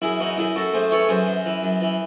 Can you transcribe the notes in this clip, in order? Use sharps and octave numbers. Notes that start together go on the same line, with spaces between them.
F#2 E4 G#4
E3 D#4 F#4
F#2 E4 G#4
F#2 F#4 A4
A3 G#4 C5
E3 A4 C#5
F#2 G#4 C5
F#2
E3
F#2
E3